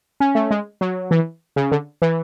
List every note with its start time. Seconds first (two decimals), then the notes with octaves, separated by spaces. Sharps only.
0.20 C#4
0.35 A3
0.51 G#3
0.81 F#3
1.11 E3
1.56 C#3
1.72 D3
2.02 E3